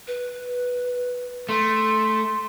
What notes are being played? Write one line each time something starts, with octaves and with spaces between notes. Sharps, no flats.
B4
A3 C6